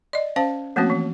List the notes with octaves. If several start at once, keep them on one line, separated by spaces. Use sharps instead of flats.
D5 D#5
C#4 C5 F5 A5
F3 A3 A#3 C4 C#4 F#4
E3